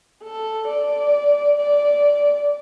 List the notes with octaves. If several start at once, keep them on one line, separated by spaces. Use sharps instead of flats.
A4
D5
D5